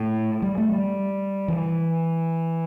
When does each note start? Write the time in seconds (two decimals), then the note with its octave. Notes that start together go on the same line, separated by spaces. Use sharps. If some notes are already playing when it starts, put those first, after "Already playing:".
Already playing: A2
0.42 G3
0.58 A3
0.72 G3
1.48 E3